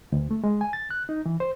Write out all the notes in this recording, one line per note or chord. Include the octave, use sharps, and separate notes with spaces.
D2
A3
G#3
G#5
A6
F#6
D#4
E3
C5